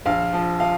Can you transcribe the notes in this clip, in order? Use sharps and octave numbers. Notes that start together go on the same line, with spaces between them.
A#1 F5
F3
F3 F5